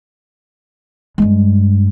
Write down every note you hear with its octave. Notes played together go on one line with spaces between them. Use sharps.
G2 G#3